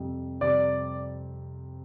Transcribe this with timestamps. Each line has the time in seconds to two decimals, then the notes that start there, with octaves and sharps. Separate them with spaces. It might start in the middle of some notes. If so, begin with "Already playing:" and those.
Already playing: F2 C3 G3 C4
0.41 F2 C3 G3 C4 D5